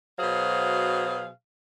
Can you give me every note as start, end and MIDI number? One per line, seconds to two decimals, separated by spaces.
0.19 1.29 47
0.19 1.29 54
0.19 1.29 68
0.19 1.29 72
0.19 1.29 77